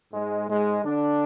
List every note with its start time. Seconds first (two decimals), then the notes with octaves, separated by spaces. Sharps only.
0.13 G#2 G#3
0.49 G#2 G#3
0.84 D3 D4